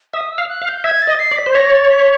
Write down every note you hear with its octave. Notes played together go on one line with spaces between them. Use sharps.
E5 D#6
E6
F5
F#6
F5
G6
E5 G#6
A6
D#5
C7
D5
B6
C5
C#5 A#6
A6
B6